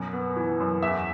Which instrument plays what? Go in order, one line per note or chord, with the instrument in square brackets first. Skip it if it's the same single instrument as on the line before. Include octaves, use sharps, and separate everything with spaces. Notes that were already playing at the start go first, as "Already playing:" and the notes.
Already playing: [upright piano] F#2 B2
B3
E3
F#2
E2 E5